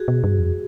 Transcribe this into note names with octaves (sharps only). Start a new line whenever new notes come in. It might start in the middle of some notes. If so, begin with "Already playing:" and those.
Already playing: F#4 G#4
B2
G2
F2